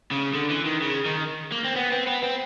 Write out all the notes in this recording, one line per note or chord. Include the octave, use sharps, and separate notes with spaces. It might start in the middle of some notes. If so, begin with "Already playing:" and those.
C#3
D3
E3
D#3
C#3
D#3
A#3
C4
B3
C4
B3
C4